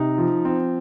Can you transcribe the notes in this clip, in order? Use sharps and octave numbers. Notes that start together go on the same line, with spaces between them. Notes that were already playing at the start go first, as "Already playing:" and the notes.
Already playing: C3 D#4
F3
C4